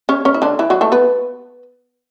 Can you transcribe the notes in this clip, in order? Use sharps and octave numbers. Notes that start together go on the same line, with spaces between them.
C#4 C#5
C#4 C#5
E4
D3 D4
E3 E4
F#3 F#4
A3 A4
B3 B4